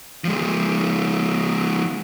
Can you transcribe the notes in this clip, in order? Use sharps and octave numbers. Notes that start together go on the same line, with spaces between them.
F3 G#3